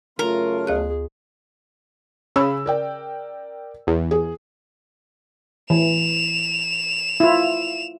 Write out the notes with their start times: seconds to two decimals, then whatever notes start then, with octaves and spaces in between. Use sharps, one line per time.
0.19 F#2 C#3 A3 F4 A#4
0.67 D2 G#4 F5 F#6
2.36 C#3 B5 E6
2.66 A#4 D5 G5
3.87 E2
4.11 G#4
5.70 E3 E7 F7
7.20 E4 F4